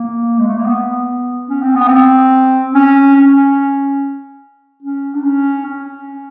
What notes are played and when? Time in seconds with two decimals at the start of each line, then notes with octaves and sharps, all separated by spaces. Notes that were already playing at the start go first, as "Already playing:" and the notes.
Already playing: A#3
0.38 G#3
0.47 A3
0.57 A#3
0.66 B3
1.49 C#4
1.62 C4
1.75 B3
1.87 C4
2.74 C#4
3.16 C#4
4.83 C#4
5.15 D4
5.24 C#4
5.66 C#4